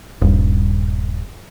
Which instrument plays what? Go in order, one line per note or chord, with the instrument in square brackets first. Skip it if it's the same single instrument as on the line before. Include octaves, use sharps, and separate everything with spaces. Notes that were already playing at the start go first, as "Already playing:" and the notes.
[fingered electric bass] D#1 G2